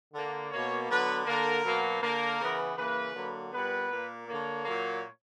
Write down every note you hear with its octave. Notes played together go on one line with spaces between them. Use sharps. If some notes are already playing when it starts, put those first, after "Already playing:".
D3 A#3
B2 A#3 C#5
D3 F#3 B3 B4
D3 A#3 A#4
B2 F#3 A#3
D3 A#3 A#4
C#3 E3 B3
C#3 E3 A#3 B4
D3 F#3 A#3
A#2 G3 B3 B4
A#2 A#3
D3 A#3 C#5
A#2 F#3 A#3